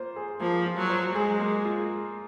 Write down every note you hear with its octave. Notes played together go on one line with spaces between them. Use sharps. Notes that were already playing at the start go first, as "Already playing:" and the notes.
Already playing: A#3 F4 C5
G#4
F3 A#3
F4
F#3
C5
G#3 G#4
A#3
F4